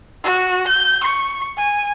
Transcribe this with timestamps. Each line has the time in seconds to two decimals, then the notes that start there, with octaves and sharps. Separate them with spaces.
0.23 F#4
0.68 G6
1.03 C#6
1.57 G#5